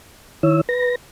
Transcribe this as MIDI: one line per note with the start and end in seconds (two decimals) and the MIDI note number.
0.43 0.61 51
0.43 0.61 64
0.43 0.61 73
0.43 0.61 88
0.69 0.95 71
0.69 0.95 94